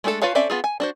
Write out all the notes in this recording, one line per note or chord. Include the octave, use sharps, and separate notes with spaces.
G#3 A3 D4 G#4 A4
F4 B4 C#5 F5 A5
C4 C#4 A4 D5 E5
B3 F4 G#4
G#5
D4 F#4 C5